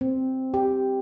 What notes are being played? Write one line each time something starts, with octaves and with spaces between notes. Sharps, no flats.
C4
G4